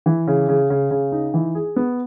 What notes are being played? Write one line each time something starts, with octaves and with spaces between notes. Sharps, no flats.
E3
C#3
C#3
C#3
C#3
D#4
E3
G#4
B3